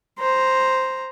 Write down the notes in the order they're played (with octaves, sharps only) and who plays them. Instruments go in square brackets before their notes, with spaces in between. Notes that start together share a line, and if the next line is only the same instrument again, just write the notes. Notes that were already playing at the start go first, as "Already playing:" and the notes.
[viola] C5 A#5